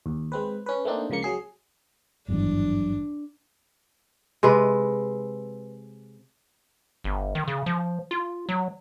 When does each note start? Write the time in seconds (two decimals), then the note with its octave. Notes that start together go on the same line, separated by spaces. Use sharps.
0.06 D#2
0.32 G#3 C4 B4
0.66 C#4 B4
0.85 A3 A#3 C4 D4 D#4
1.10 C#2 C#3 F3 A#3 C#7
1.23 F#3 G#4 C7
2.28 G#1 E2 G2 F#3 D4
4.43 C3 G#3 B4
7.04 G1
7.35 D#3
7.48 C#3
7.66 F3
8.11 F4
8.49 F#3